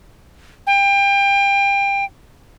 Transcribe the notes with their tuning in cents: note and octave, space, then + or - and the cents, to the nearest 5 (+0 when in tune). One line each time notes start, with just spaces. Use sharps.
G5 +30